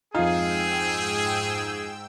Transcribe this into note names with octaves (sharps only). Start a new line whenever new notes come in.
F2 G#2 D#4 F4 G#4 G5 E6